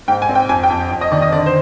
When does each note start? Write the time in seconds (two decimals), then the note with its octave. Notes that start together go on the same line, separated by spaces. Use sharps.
0.08 G#2 G5
0.22 G#5
0.29 C4
0.35 G5
0.49 F2 G#5
0.63 G5
0.70 F2
0.91 F2
1.01 D#5
1.12 D#3 D5
1.22 D#5
1.32 D3 D5
1.46 C5